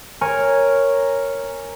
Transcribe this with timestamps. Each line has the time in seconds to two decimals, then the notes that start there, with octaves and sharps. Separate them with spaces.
0.21 A#4 C#5 G#5